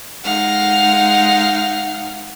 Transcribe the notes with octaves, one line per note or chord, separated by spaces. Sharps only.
G#3 D#4 F5 F#5